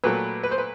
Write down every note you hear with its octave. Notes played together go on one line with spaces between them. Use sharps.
A#2 F#3 A3 B4
B4
C5
B4